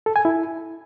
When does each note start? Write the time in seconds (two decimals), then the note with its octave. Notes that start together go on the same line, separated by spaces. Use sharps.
0.06 A4
0.16 G#5
0.25 E4